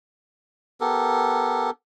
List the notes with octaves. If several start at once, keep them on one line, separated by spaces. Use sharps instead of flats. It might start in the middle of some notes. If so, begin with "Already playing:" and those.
B3 G4 A4 A#4